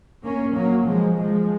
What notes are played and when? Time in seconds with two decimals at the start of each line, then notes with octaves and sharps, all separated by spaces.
0.24 A#3 C#4
0.55 F#3 A#3
0.87 F3 G#3
1.17 F3 G#3